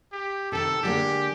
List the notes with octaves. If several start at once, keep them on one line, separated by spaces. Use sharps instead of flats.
G4
C3 D#3 A4
D3 G#3 A#3 G4